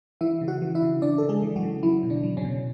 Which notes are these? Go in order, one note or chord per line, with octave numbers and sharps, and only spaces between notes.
E3 E4 E5
C#3
F#4 F#5
E3
E4 E5
C#3
E3 D4 D5
C#3 A4
G#3 G#4
E3
F#3 F#4
C#3
E3 F#3 E4
B2
D3 D4
F#3
C#3 C#4
B2